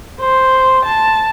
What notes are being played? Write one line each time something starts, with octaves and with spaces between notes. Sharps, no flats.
C5
A5